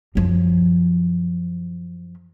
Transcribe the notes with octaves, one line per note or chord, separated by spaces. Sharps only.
F#2 F3